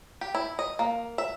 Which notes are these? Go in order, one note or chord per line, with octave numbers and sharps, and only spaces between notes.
G4
E4
D#5
A#3
E5